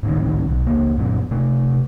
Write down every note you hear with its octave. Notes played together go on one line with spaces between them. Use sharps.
G#1 C#2 A2 D#3
B1
C#2 A#3
F#2 A#2 F#3 B3
C3 A3